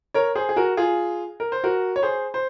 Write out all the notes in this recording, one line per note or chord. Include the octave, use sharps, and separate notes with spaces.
A#4 C#5
G#4 C5
G#4
F#4 A#4
F4 G#4
A#4
C5
F#4 A#4
C#5
G#4 C5
C5